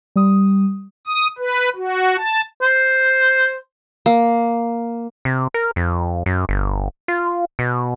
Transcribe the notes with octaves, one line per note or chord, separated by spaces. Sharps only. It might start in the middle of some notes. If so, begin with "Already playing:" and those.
G3 D#6
D#6
B4
F#4
A5
C5
A#3
C3
A#4
F2
F#2
G1
F4
B2